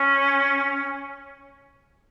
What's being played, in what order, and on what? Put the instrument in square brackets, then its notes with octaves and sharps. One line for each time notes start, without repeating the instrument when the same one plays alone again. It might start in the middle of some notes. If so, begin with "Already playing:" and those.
Already playing: [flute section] C#4